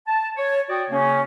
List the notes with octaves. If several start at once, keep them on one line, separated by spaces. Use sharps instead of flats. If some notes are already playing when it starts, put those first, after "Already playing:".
A5
C#5
F#4 D5 G5 D#6
C#3 A#3 C#4